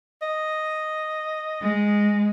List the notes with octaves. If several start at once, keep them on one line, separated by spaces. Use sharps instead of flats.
D#5
G#3